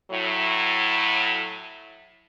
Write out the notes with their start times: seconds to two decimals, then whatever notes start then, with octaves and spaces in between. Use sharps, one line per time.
0.11 A2 F#3 E4